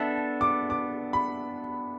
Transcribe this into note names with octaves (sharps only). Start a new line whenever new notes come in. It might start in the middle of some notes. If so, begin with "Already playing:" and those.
Already playing: B3 D4 A4 E5
D6
D6
B5